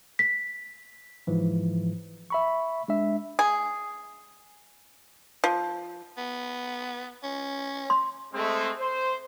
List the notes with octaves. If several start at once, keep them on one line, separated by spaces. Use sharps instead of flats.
B6
G#2 E3 F3
E5 B5 C#6
G#3 D4 E5
G#4
F3
B3
C#4
C6
G#3 A3 C4
C5